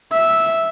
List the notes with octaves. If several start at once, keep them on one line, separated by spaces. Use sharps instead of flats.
E5